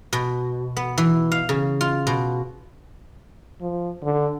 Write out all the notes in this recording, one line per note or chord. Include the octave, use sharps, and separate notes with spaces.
B2
B3
E3
F5
C#3
F4
B2
F3
D3